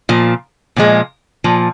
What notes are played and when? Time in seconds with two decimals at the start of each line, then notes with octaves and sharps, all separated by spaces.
0.09 A#2 F3
0.76 A#2 F3 G#3
1.44 A#2 F3